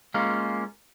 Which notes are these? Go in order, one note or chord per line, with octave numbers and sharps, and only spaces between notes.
G#3 A#3 C#4 F4